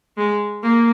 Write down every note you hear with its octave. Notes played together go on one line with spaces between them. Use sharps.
G#3
A#3